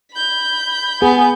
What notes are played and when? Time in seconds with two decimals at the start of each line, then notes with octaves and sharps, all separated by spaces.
0.12 B5 G6
1.02 B3 G#4 G#5